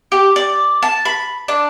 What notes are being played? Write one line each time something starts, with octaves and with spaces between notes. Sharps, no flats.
G4
D5
A5
B5
D4